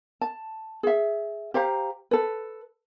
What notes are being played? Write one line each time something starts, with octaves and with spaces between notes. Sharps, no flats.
A5
G#4 E5
G4 C5 F5 A#5
A4 B4